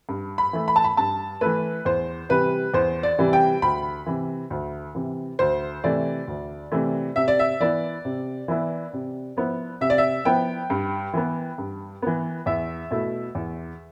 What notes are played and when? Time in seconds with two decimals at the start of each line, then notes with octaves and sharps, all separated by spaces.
0.09 G2
0.38 B5
0.53 E3 A3
0.68 B5
0.76 A5
0.84 B5
0.97 G2 A5
1.41 E3 A3 B4
1.85 E2 C5
2.29 C3 E3 G3 B4
2.74 E2 C5
3.03 D5
3.18 C3 E3 G3
3.33 G5
3.62 D2 B5
4.06 C3 E3
4.50 D2
4.95 C3 E3
5.39 D2 C5
5.84 C3 E3 A3 D5
6.27 D2
6.72 C3 E3 A3
7.16 C3 E5
7.28 D5
7.39 E5
7.60 E3 B3 E4 D5
8.05 C3
8.48 E3 B3 E4
8.93 C3
9.37 F3 B3 E4
9.81 C3 E5
9.90 D5
9.98 E5
10.25 F3 B3 E4 G5
10.70 G2
11.13 E3 B3
11.58 G2
12.02 E3 B3
12.46 E2 E5
12.91 B2 A3 E4
13.35 E2